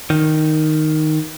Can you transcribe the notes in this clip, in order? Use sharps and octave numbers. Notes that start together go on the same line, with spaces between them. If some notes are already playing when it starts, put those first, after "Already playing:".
D#3